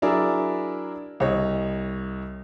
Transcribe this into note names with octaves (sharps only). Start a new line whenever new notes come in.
F#3 D4 E4 G#4 A#4 D5
C2 C#5 D#5